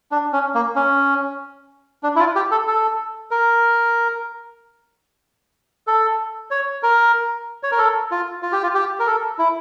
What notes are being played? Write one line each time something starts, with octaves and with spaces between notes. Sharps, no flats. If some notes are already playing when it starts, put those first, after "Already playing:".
D4
C#4
A#3
C#4
D4
E4
F4
G4
A4
A4
A#4
A4
C#5
A#4
C#5
A#4
A4
F4
F4
G4
F4
G4
A#4
A4
E4